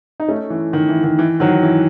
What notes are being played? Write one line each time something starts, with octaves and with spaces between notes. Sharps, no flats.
D#4
A3 C#4
E3
D#3
E3
D#3
E3
D#3 F#3
E3